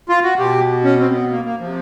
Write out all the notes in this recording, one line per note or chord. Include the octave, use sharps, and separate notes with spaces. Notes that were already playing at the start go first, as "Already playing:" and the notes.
F4
F#4
B2 G4
C#4
C4
B3
A#3
A#3
C3 F3